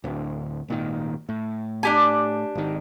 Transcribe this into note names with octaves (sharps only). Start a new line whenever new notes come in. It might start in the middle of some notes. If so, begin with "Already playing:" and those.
D1 D2
G#1 A#2 D#3
A2
D4 G4 G#5
G#1 D#3